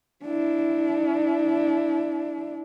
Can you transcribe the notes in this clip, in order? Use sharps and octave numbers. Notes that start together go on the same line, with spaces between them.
D4 E4